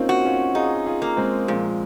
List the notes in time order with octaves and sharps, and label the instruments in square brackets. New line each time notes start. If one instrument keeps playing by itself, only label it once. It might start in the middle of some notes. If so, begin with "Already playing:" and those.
Already playing: [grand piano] A#3 C4 C#4 D#4 F4
[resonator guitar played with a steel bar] F#4
[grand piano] C#4 F4
[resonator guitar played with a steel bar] D#4 [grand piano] F4 G#4
[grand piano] F4 G#4
[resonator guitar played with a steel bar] A#3
[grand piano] G#3 C4
[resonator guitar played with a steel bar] A#2 [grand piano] F3 G#3